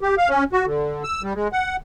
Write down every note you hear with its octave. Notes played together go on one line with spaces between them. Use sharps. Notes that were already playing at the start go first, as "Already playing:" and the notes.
G4
F5
C#4
F#4
D3
E6
G3
G#3
F#5